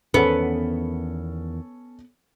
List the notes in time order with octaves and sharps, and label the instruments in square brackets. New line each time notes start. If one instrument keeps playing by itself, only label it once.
[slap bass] E2 D#3 [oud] B3 [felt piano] C#4 A4